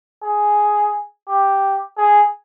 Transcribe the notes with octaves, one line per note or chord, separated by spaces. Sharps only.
G#4
G4
G#4